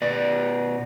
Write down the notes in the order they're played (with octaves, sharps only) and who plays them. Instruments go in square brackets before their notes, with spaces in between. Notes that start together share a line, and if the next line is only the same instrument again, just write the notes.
[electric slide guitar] B2 B4 D5